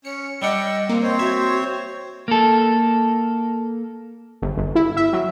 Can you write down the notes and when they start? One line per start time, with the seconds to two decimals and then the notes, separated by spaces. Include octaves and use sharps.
0.05 C#4 C#5 C#7
0.42 G3 D4 D#5 F#5 G5 E6
0.89 A#3 C4
1.03 C4 C5 C#5 D#5
1.19 F#4 E5 G#6
2.28 A#3 A4
4.42 G1
4.57 G1
4.75 E4
4.97 E5
5.13 F#3